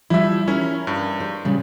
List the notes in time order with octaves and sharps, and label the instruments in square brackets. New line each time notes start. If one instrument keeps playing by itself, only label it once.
[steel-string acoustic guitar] F3 G3 [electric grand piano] E4 E5
[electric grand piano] C#4 E4 [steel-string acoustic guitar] A#4 C#5
[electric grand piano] G2
[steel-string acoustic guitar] C5
A#2 C#3 G3